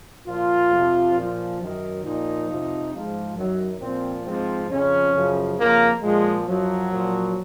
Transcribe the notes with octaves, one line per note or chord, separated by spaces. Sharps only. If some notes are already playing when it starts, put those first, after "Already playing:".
A#2 F3 F4
F2 C3 F3
A#2 F3
F#2 D#3
A#2 F3 D#4
F2 C3 F3
G#2 F3
F#2 D#3 F#3
A#2 F3 C4
G#2 F3 C4
F2 C#3 F3 C#4
F#2 C#3 F3
F2 C#3 F3 A#3
A#2 F3 G#3
F#2 F3 F#3
A#2 F3